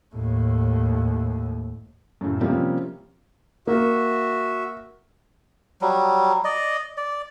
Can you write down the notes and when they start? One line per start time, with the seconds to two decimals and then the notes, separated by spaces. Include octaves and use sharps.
0.15 D#2 A2
2.21 F#2 A2 C#3
2.41 C3 F3 G3 A#3 C4 C#4
3.67 A#3 F#4 E5
5.82 F#3 G3
6.45 D5 D#5
6.97 D5